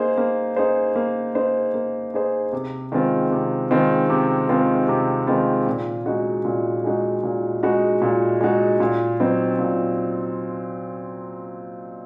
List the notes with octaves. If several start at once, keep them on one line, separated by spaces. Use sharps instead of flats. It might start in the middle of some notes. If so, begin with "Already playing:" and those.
Already playing: A#3 D#4 G#4 C5
A#3
D#4 G#4 C5
A#3
D#4 G#4 C5
A#3
D#4 G#4 C5
C3
D#3 G#3 C4 F4
C3
D#3 G#3 C4 F4
C3
D#3 G#3 C4 F4
C3
D#3 G#3 C4 F4
A#2
G#3 D#4 F#4
A#2
G#3 D#4 F#4
A#2
G#3 D#4 F#4
A#2
G#3 D#4 F#4
A#2
F#3 C4 D#4
A#2